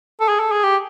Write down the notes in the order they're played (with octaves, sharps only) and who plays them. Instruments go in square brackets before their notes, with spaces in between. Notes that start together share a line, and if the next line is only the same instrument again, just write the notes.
[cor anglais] A4
G#4
A4
G#4
G4